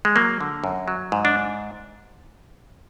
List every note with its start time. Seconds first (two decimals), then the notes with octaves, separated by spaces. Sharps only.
0.05 G#3
0.16 F#3 A#3
0.41 D3
0.64 F#2
0.88 F#3
1.12 G#2
1.25 D4